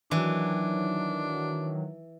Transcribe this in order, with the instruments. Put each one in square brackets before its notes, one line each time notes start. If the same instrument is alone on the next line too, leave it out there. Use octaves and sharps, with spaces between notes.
[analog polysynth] D#3 F#3 [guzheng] E3 [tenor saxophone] D4